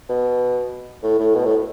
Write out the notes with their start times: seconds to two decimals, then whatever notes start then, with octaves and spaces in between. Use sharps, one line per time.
0.09 B2
1.03 A2
1.19 A2
1.35 B2
1.45 A2